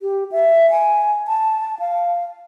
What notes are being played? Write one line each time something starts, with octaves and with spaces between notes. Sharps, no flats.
G4
E5
G#5
A5
F5